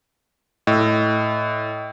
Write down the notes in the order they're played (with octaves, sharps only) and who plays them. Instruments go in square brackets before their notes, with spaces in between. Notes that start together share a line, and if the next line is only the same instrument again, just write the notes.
[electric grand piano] A2 [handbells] D#5 E6